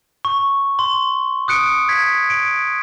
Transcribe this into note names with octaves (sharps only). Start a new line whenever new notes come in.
C#6
C6
D#6 F#6 C#7 D7
G#6 B6
D7